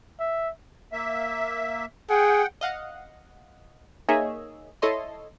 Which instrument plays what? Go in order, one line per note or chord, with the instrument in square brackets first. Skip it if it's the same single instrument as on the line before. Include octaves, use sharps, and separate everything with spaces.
[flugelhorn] E5
[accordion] A#3 E5
[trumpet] G#4 [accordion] F#5 G5
[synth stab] D#5 F5 F#5
A#3 D#4 G#4 C#5 D#5 E5
E4 A4 C#5 D#5 C6